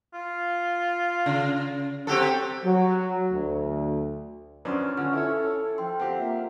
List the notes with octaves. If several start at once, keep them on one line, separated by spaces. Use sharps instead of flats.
F4
C#3
F#3 C4 G4 A4
F#3
D2
F#2 F3 C#4 D4 B4 C6 F6
D3 F4 F6
E4 A4 C#5
F3 G5 C6
C4 F4 G4 F#5
A#3 E5